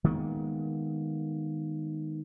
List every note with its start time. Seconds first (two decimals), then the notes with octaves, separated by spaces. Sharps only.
0.04 D#3 G#3 A#3 B3